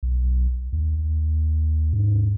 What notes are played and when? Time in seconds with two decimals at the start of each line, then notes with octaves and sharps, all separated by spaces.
0.03 B1
0.73 D#2
1.93 G#2